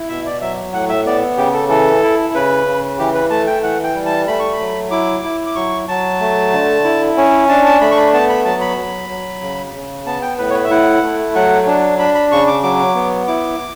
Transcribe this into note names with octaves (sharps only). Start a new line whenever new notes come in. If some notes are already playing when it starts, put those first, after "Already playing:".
Already playing: E4
B2 E5
D5
F#3 E5
A2 F#5
E5
B3 D5
C#3 G4
A4
E3 A4
E4
C#3 B4
C#3
E3 G4
B4
A3 A5
G5
E3 F#5
G5
G3
A5
A3 B5
C#6
B5
F#3
E4 D6
E4
D6
F#3 C#6
F#3 A5
A3
D3
E4
C#4
D4 A5
A5
A3 B5
C#6
B5
B3 A5
B5
F#3 A5
B5
F#3
F#3
C#3
C#3
B3 A5
G5
A2 B4
C#5
B4
E5
E4 F#5
A3
F#3 F#5
D4
D4 B5
B5
C#3 C#6
D6
F#3 D6
B3
E4 D6